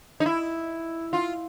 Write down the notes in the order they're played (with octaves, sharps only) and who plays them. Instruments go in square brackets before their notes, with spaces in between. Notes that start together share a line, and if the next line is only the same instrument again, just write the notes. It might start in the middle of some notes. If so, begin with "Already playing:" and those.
[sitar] D#4
E4
F4